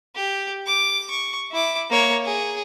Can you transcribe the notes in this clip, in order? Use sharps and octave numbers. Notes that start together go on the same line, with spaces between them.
G4
D6
C#6
E4 D6
A#3 C#5
G#4